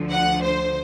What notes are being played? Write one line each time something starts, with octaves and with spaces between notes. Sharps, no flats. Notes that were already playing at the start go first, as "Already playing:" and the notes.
Already playing: D2 D3 F3
F#5
C5